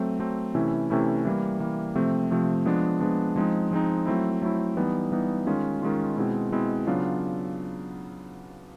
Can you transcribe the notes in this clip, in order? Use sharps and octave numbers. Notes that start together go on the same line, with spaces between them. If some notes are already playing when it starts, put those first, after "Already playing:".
Already playing: F#3 A3 C4
F#3 A3 C4
C3 E3 A3 C#4 E4
C3 E3 A3 C#4 E4
E3 G3 A#3
E3 G3 A#3
C3 F3 A3 C4
C3 F3 A3 C4
F3 G#3 B3 D4
F3 G#3 B3 D4
F3 G#3 C4 D#4
F3 G#3 C4 D#4
F#3 A3 C4 E4
F#3 A3 C4 E4
E3 G3 B3 D#4
E3 G3 B3 D#4
D#3 G#3 C#4 F4
D#3 G#3 C#4 F4
B2 G#3 C4 E4
B2 G#3 C4 E4
C#3 F#3 B3 D4 F4